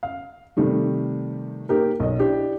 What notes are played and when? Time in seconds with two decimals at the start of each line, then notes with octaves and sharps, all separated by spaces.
0.03 F5
0.57 C3 D#3 G3 A3
1.69 A#3 D#4 G4 A#4
2.00 B1 D#5
2.19 D4 E4 G4